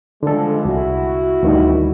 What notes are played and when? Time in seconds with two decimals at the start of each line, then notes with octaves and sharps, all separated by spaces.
0.23 D3 F3 G3 G#3 A4
0.65 C2 E4 F#4
1.43 D2 D#3 G3